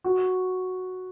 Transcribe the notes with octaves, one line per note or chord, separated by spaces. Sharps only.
F#4